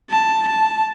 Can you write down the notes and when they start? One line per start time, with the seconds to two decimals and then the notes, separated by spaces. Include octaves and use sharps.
0.10 A5
0.48 A5